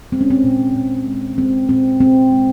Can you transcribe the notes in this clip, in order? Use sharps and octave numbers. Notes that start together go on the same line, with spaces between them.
G#3 C4
C#4
C4
A#2
A#2
G#3
G#3 C4
A#2 C4
A#2 C4
G#3